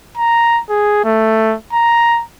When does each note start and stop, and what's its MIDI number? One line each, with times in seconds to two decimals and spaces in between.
0.18 0.61 82
0.70 1.00 68
1.05 1.56 57
1.73 2.22 82